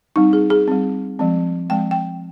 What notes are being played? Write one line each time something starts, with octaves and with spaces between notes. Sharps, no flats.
G3 C4 D#4
G#4
G#4
G3 C4
F3 G#3 C4
F3 G#3 C4 G5
G5